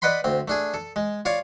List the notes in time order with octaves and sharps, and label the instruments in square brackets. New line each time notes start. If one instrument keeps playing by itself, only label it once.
[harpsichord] B4 D5 D#5 F#5 B5 C6
D2 C4
A3 D4 G#4
A4
G#3
F4 C#5 D5 F5